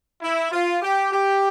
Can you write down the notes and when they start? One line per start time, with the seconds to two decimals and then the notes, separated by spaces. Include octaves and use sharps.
0.22 E4
0.51 F4
0.82 G4
1.12 G4